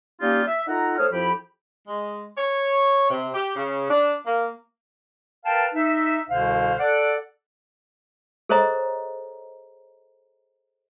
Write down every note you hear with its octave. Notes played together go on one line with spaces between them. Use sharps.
G3 A#3 C#4 D#4 F4 G4
E5
D#4 F4 A4 F#5 A#5
A3 C5 C#5 D#6 F6
F2 F3 E4 G4 B5
G#3
C#5
C3
G4
C#3
D4
A#3
A#4 B4 F5 G5 A5
D#4 E5
C2 B2 D3 C5 F5
A4 D5 F#5
G#4 A4 C5 C#5 D#5 A#5